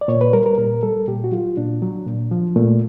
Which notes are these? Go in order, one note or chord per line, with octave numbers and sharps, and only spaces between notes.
D5
A#2 C#5
B4
G3 A#4
A#4
A#2 A#4
G3 A4
A#2 G4
F#4
F#3 F4
A#2 D4
F#3
A#2
F3
A#2 A3